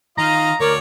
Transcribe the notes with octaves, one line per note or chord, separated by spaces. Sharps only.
D#3 F4 D#5 F5 A#5
D2 A#4 C#5 D5